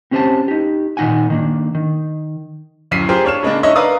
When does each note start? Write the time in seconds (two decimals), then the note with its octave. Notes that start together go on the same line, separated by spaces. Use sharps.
0.11 C4 C#4 G4 C5 G#5 A5
0.48 D#4 G4
0.97 A#2 D#3 A#3 D#4 F#5 G#5
1.30 D#3 A#3 D4
1.75 D#3
2.91 D1 F#2 B6 C7 D#7
3.09 F4 G4 G#4 A#4 C5 G5
3.25 D4 C#5 F6 E7
3.43 C#3 G#3 A#3 D4
3.63 D4 D#4 C#5 D#5 E5
3.76 A#4 B4 D5 F5 D#6